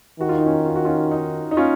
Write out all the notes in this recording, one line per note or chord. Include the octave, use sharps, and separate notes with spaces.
D#3 F#4
F4
D#4
C#4 F4
F4
F#4
C#4 F4
D#4
D#4
C#4 F4